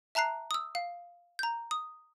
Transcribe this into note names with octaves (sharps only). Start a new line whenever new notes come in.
E5 A5 A#5 F#6 C7
D#6 E6
F5
A#5 G6
D#6